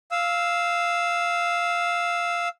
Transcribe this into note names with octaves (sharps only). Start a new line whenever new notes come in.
F5 E6